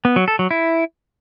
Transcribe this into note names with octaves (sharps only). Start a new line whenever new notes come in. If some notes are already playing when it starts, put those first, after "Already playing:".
B3
F#3
A4
F#3
E4